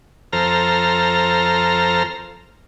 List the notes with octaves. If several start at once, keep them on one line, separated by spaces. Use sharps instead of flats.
F2 A4 C5 A#5 F6